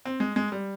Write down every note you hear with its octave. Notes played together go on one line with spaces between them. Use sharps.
C4
G#3
G#3
G3